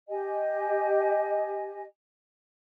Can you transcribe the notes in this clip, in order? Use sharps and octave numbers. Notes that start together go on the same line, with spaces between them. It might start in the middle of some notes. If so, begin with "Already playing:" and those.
G4 D#5 G#5